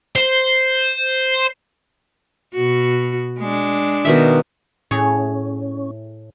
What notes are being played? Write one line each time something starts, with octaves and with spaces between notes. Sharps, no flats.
C5
B2 F#4
G#3 D4
B2 D#3 E5
A2 C#4 G#4 C#5